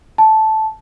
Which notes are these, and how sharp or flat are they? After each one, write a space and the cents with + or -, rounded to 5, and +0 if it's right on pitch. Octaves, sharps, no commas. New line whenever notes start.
A5 -10